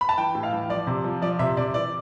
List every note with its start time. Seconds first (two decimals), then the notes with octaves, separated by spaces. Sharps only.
0.01 B5
0.09 A5
0.18 E3 G5
0.35 A2
0.43 F5
0.53 E3
0.70 F3 D5
0.87 C3
1.04 F3
1.22 F3 D5
1.39 C3 E5
1.57 C3 D5
1.74 E3 D5